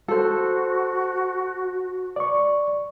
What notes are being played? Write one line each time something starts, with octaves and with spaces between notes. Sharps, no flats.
F#4 A4 C5
D5 C#6